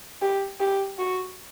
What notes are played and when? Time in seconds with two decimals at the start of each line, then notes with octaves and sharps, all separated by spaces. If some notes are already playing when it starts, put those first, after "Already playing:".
0.22 G4
0.60 G4
0.99 F#4